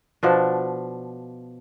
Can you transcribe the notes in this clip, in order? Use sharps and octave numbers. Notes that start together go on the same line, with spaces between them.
B2 F3 D4